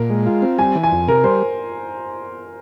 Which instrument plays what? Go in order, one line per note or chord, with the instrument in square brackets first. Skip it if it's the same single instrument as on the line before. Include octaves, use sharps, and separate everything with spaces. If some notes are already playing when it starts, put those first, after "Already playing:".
Already playing: [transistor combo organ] A#2 [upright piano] A#4
[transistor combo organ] G#3
F4
C4
[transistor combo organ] G3 [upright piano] G#5
[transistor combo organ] E3
[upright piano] G#5
[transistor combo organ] F2
[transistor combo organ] C3 [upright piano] A#4
[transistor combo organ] G3 [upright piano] C5